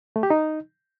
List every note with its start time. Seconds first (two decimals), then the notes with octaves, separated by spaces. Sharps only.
0.16 A3
0.23 G4
0.30 D#4